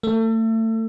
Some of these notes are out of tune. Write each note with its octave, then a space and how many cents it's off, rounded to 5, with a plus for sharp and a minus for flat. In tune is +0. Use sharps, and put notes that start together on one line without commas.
A3 +30